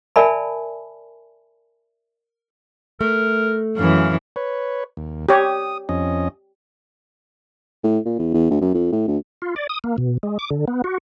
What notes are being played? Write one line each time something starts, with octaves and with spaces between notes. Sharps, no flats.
A#4 D5 E5 G#5 A5 B5
A3 A#4
F#2 E3 F5
B4 C#5
D#2
G4 C#5 D#6
F2 C#4 D#5
A2
A#2
E2
E2
D2
F#2
F2
A2
D2
F4
D5
D#6
A#3
B2
G#3
D6
D3
B3
F#4